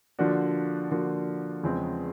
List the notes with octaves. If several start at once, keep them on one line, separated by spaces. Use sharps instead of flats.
D3 F3 A#3 D4 F#4
D3 F3 A#3 D4 F#4
E2 C#3 F3 G#3 C4